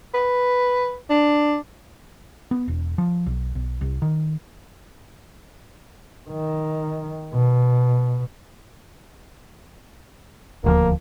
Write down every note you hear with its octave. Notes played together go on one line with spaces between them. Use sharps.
B4
D4
B3
E1
F3
B1
B1
C2
D#3
D#3
B2
D#1 D2 F3 A#3